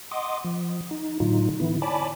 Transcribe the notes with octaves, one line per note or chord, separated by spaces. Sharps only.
D#5 F#5 C6 D6 D#6
F3
D#4
A2 D3 F#3 D#4 F4
D3 E3 B3 E4
C#5 D5 G#5 A5 B5 D6